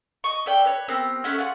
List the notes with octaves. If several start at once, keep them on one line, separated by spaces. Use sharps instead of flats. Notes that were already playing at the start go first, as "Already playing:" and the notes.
D#5 C#6
A4 B4 D5 G5
B4 C#5
B3 C4 G4 A#4
A3 C#4 F#5 F#6
F4 G#4 F#5